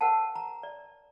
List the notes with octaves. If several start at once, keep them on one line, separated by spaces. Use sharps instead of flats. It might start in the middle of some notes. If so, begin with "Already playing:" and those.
A#4 C5 F#5 G5 A5
A#5
D5